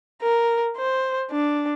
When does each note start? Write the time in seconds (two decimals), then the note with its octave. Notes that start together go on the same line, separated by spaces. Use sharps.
0.22 A#4
0.77 C5
1.31 D4